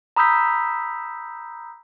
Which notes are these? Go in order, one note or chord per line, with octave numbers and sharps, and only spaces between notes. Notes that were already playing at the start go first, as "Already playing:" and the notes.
A#5 B5 D#6 E6 G6 B6